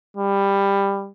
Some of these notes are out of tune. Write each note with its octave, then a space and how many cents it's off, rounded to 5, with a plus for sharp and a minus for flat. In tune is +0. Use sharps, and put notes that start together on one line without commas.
G3 +15